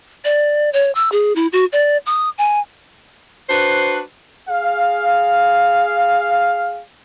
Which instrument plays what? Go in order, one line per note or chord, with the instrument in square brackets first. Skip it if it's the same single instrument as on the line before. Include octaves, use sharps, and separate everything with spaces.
[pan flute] D5
C#5
E6
G#4
E4
F#4
D5
D#6
G#5
[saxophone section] D4 F#4 B4 C5
[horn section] G#4 F5